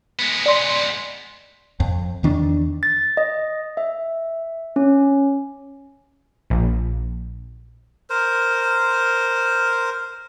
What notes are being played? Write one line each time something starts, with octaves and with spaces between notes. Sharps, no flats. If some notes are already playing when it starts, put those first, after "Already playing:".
G#3 B3
D5 C6
F2
E2 D#3 D4
A6
D#5
E5
C#4
A#1
A#4 C5